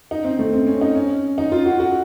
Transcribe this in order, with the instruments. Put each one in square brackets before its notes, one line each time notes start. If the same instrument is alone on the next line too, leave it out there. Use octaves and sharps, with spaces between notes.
[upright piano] D#4
C4
A3
C4
C#4
D#4
C#4
D#4
F4
F#4
F#4